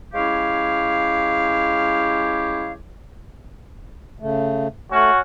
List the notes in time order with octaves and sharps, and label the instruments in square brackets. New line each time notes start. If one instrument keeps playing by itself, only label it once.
[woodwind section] G#3 C#4 E4 G4 C#5 F5
[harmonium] C#3 A3
[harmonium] A3 [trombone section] C#4 F#4